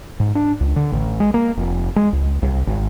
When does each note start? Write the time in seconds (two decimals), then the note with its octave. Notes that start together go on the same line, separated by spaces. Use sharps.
0.20 G#2
0.35 D4
0.61 C#2
0.76 D3
0.92 A1
1.20 G#3
1.34 A#3
1.57 F1
1.96 G#3
2.13 C#2
2.42 C2
2.67 G#1